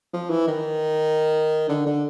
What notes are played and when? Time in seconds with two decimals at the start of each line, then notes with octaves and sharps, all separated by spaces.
0.13 F3
0.30 E3
0.48 D#3
1.69 D3
1.86 D3